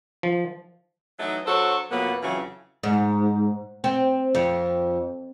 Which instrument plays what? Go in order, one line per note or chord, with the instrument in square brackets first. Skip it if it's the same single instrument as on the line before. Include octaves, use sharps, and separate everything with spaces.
[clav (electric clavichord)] F3
[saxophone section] E3 F#3 A3 D#4
F#3 D4 F#4 A4 C5 C#5
F2 B2 F#3 A#3 B3 B4
F2 C#3 E3 F#3
[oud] G#2
C4
F2